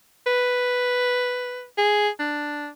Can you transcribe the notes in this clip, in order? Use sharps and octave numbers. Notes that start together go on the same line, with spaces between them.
B4
G#4
D4